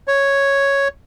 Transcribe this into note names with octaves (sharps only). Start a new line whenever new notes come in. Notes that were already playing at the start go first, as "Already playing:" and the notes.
C#5